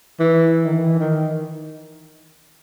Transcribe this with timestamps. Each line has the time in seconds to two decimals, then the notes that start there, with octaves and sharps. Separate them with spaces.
0.20 E3
0.66 D#3
0.73 E3
0.99 D#3